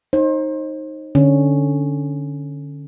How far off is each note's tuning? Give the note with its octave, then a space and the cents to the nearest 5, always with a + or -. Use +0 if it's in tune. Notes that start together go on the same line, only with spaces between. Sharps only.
D#4 +0 C5 +35
D3 +0 C#4 +0